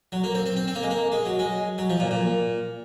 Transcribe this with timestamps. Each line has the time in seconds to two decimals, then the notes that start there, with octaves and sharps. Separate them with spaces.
0.12 F#3
0.24 A#3
0.35 C4
0.46 C4
0.56 C4
0.67 C4
0.75 A#3
0.83 G#3
0.91 A#3
1.12 G#3
1.26 F#3
1.39 G#3
1.78 F#3
1.90 F3
2.00 A#2
2.11 A#2